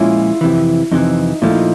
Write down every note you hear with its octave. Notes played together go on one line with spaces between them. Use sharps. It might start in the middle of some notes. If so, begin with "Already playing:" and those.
Already playing: A#2 F3 G#3 C#4 E4 F4
F2 C3 E3
F2 C3 E3 D#4
A#2 F3 A3 E4
D#4